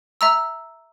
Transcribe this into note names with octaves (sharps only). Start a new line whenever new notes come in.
E5 A#5 E6